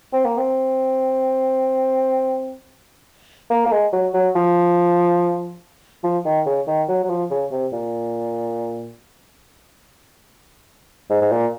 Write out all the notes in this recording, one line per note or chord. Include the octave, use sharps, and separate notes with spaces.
C4
A#3
C4
A#3
A#3
G#3
F#3
F#3
F3
F3
D#3
C#3
D#3
F#3
F#3
F3
C#3
C3
A#2
G#2
G#2
A#2